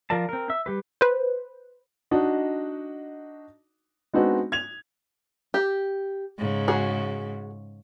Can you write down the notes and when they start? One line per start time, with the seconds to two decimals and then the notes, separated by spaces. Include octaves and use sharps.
0.10 F3 F4 A#4 D5 A5
0.29 C4 A#4
0.50 E5 E6
0.66 G3 G4 B4
1.01 B4 C5
2.11 D4 D#4 F#4 D#5
4.14 G#3 B3 C4 D4 D#4 F#4
4.52 G#6 F7
5.54 G4
6.38 G#2 C#3
6.68 F#4 G#4